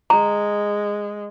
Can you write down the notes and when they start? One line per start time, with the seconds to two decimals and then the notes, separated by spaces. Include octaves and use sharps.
0.10 G#3 A#5